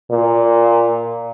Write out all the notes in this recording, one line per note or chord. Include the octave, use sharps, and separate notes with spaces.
A#2